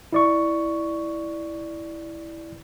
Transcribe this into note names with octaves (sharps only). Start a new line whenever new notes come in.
E4 D5 C#6